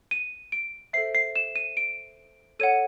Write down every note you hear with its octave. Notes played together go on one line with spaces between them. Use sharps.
D#7
D7
A4 C5 E5 C7
C7
E7
D#7
D7
A4 C#5 F#5 D#7